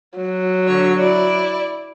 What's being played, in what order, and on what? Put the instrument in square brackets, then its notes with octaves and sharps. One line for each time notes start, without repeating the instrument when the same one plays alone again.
[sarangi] F#3
[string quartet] D3 C#5
E4 D5